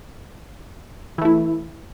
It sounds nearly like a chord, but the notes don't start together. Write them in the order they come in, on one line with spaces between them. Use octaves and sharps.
E3 A3 E4